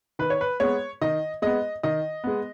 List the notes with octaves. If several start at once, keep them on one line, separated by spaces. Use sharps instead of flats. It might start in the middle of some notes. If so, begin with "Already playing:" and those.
D#3 B4
C#5
B4
G#3 B3 C#5
D#3 D#5
G#3 B3 D#5
D#3 D#5
G#3 B3